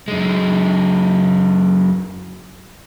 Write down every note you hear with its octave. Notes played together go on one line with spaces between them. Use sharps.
F#2 G#3